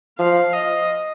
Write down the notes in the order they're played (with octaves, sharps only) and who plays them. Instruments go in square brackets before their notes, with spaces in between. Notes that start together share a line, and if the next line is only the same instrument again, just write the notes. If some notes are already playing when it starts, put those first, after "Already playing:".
[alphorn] F3 [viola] F5
[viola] D#5